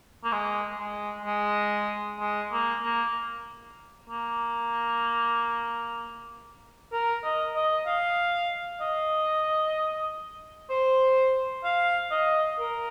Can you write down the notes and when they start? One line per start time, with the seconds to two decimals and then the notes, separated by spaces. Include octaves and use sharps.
0.24 A#3
0.32 G#3
0.78 G#3
1.25 G#3
2.20 G#3
2.52 A#3
2.83 A#3
4.10 A#3
6.93 A#4
7.24 D#5
7.56 D#5
7.87 F5
8.81 D#5
10.70 C5
11.64 F5
12.11 D#5
12.59 A#4